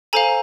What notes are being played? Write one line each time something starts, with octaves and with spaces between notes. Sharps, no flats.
A4 C5 F5 G#5 A#5